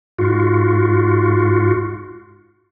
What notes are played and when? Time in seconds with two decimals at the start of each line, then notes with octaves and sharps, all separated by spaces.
0.18 G#2 F4 F#4